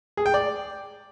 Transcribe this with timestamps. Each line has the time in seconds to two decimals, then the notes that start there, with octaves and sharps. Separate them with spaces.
0.17 G#4
0.26 G5
0.34 D5